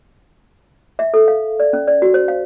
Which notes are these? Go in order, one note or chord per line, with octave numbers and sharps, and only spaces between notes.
E5
A4
F5
D5
C#4
D5
F#4
C5
F5